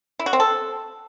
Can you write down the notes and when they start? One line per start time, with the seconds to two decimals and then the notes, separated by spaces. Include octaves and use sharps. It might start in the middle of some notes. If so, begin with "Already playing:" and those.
0.19 E4
0.26 F#4
0.33 C4
0.40 A4